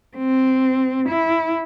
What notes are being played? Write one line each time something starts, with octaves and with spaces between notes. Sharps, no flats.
C4
E4